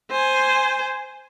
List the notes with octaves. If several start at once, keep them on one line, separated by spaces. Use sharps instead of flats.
C5 G#5